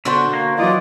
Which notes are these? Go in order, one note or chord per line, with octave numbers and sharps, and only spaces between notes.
B2 D3 D4 F#4 C5
A#3
E3 F#3 F4 D5 D#5